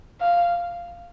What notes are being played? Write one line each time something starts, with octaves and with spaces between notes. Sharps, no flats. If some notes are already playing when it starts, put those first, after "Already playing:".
F5